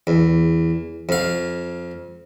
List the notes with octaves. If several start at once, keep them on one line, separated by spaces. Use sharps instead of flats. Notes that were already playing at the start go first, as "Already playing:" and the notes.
E2
F2 F5